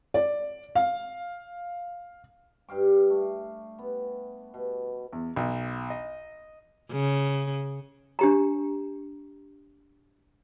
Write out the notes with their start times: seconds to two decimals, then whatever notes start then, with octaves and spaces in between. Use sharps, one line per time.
0.14 D5
0.75 F5
2.68 G2 G4 F5 D6
3.10 A3
3.78 B3
4.54 B2
5.13 E2
5.36 B1
5.90 D#5
6.92 C#3
8.19 D4 G4 A#5